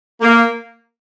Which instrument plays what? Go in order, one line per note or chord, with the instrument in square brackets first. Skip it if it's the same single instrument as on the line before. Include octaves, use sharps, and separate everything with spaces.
[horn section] A#3